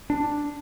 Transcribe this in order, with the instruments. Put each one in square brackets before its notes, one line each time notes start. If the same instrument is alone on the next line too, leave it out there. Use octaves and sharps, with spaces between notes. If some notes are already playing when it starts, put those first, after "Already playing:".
[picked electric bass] D4